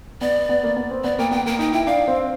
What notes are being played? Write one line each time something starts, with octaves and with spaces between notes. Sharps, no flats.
B3 D5
B3
A#3
B3
C4
B3 D5
A#3 G5
B3 G5
A#3 G5
D#4 G5
E4 G5
D4 F5
C4